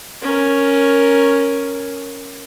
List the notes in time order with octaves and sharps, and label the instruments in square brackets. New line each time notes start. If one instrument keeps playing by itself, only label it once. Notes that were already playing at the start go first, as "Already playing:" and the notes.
[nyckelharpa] C#4 A#4